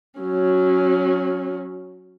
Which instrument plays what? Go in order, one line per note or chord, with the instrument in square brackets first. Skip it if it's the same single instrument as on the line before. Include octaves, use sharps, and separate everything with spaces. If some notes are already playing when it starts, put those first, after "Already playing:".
[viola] F#3 C#4